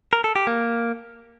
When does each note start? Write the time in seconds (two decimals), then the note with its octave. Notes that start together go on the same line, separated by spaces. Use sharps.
0.13 A#4
0.24 A4
0.36 G4
0.47 A#3